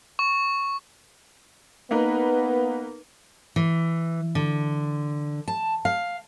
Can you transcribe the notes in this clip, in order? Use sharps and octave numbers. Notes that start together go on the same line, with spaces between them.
C#6
A#3 B3 D#4 B4
E3
D3
A5
F5